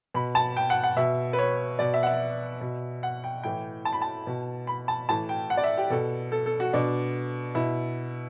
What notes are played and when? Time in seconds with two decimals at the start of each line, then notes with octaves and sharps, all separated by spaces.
0.14 B2 B5
0.35 A5
0.57 G5
0.70 F#5
0.84 F#5
0.97 B2 E5
1.33 B4
1.39 C#5
1.79 B2 D5
1.94 E5
2.03 F#5
2.06 E5
2.61 B2
3.03 F#5
3.24 G5
3.44 A2 E3 G5
3.85 A5
3.93 B5
4.02 A5
4.27 B2
4.67 B5
4.88 A5
5.09 A2 E3 A5
5.29 G5
5.50 F#5
5.57 D5
5.64 E5
5.78 G4
5.90 B2 A4
6.32 A4
6.46 A4
6.60 F#4
6.73 B2 D4
7.55 B2 E4